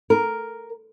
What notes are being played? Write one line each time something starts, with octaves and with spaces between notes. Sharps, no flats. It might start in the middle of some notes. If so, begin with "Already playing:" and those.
A#4